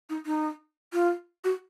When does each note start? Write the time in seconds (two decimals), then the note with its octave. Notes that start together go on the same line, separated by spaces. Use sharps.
0.10 D#4
0.26 D#4
0.93 F4
1.44 F#4